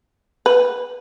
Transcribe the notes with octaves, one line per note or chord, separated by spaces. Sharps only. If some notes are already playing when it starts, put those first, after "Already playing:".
B4